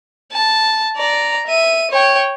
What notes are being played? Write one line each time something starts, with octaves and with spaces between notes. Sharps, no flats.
A5
D5 A#5
E5 D#7
C#5 G5